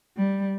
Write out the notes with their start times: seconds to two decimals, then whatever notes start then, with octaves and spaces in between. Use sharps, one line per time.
0.17 G3